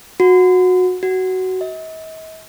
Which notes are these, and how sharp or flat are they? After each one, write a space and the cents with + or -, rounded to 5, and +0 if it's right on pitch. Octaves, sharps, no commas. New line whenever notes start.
F#4 -20
F#4 +15
D#5 +45